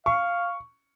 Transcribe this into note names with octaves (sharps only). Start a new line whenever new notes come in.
F5 C#6